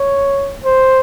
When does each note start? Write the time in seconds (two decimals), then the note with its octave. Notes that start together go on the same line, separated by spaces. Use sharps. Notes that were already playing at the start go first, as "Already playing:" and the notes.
Already playing: C#5
0.64 C5